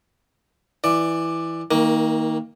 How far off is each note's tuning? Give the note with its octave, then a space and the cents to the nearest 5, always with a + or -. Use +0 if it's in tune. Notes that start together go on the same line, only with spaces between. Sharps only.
E3 +0 D5 +10
D#3 +30 A#3 +0